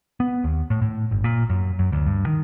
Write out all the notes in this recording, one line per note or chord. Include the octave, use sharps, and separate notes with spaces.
B3
D#2
A2
A2
G1
A#2
F#2
F#2
D2
G2
D#3